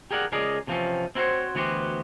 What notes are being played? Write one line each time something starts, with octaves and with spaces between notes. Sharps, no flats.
G4 G#4 A#4 D5 F#5
C#2 C#4 G#4 A#4 D5 D#5
C3 E3 F3 G#3 C4 C#4
C4 E4 F#4 A#4 C5 C#5
D2 E3 B3 F#4 G4 C5